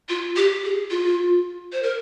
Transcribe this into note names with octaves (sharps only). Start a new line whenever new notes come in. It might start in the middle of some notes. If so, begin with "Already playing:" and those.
F4
G4
G#4
F4
C5
A#4